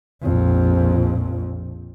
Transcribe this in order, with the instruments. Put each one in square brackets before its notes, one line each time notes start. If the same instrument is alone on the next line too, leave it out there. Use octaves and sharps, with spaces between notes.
[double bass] A#1 F2